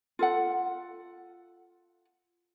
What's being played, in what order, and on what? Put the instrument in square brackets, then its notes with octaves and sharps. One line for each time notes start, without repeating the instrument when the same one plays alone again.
[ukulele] F4 A4 F#5